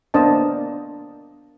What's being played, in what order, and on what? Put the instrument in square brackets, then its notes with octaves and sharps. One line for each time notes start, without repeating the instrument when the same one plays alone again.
[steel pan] A#3 B3 D4 C5 D#5 A5